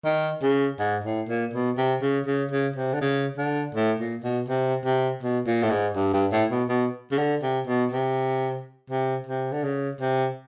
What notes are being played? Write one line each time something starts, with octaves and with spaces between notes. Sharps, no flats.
D#3
C#3
G#2
A2
A#2
B2
C3
C#3
C#3
C#3
C3
D3
C#3
D3
A2
A#2
B2
C3
C3
B2
A#2
A2
G#2
G2
G2
A2
B2
B2
C#3
D3
C3
B2
C3
C3
C3
D3
C#3
C3